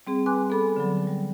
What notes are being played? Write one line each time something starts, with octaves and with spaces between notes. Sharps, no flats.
G3 C4 G#4
B4 G#5 C6 D6 F#6
B3 A4 B5
D3 F#3
G3